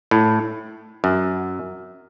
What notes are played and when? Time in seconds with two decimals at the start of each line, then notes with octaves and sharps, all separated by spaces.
0.11 A2
1.04 F#2